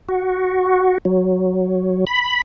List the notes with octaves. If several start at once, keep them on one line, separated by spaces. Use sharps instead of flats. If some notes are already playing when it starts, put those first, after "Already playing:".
F#4
F#3
B5